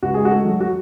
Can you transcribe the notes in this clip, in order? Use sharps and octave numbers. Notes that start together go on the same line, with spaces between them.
C#2 F#4
G#3 G#4
F#4
A3
F#3
F#4